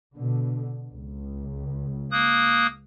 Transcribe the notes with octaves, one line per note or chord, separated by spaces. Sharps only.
B2 D3
C#2
A#3 D#6 F#6